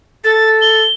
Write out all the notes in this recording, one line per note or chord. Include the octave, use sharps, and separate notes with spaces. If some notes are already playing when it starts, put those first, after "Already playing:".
A4 A6
G7